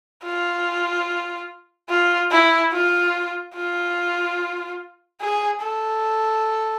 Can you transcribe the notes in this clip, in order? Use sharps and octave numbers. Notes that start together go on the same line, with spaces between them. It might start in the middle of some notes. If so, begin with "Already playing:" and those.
F4
F4
E4
F4
F4
G#4
A4